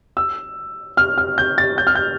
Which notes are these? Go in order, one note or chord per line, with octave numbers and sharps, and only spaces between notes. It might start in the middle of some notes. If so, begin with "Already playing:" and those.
E6
F6
F6
G6
A6
G6
F6
G6